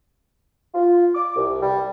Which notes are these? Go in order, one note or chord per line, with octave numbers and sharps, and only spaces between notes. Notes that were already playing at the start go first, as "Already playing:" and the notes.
F4
D6
C2
G3